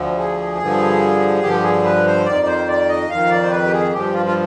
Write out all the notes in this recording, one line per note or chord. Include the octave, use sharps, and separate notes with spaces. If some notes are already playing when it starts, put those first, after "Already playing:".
Already playing: D2 D3 F3
G#4
G2 D3 F3
G2 D3 F3 G4
G#4
B4
C5
F2 D#3 D5
C5
D5
D#5
F2 D#3 F5
D5
C5
B4
G4
G#4
G2 F3 G4
F4
F4